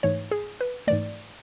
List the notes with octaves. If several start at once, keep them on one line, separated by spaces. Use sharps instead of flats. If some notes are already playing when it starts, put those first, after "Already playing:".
G#2 E3 A3 C#5
G#4
B4
G#2 E3 A3 D5